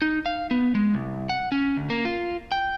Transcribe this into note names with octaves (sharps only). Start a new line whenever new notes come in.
D#4
F5
B3
G#3
C2
F#5
C#4
D2
A#3
F4
G5